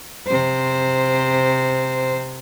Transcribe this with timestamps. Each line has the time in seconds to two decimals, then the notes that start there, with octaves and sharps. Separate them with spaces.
0.27 C3 C5